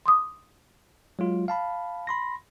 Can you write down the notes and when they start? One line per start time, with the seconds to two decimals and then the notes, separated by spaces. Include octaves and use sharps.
0.06 C6 D6 D#6
1.19 F#3 G#3 F4
1.48 F5 A5 B5
2.07 B5 C6 A#6